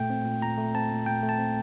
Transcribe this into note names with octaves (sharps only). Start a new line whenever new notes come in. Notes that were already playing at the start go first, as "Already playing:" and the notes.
Already playing: A#2 A3 G5
C4
A#2
A#2 A#5
A3
C4 A5
A#2
A#2 G5
A3
A5
C4